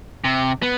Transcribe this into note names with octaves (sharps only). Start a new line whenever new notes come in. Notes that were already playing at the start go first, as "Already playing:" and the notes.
C3
B3